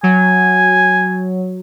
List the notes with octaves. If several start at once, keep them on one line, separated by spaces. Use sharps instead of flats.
F#3 G#5